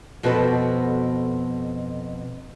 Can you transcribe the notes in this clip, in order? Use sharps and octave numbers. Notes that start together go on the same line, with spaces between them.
F2 B2 C4 F#4 A4 B4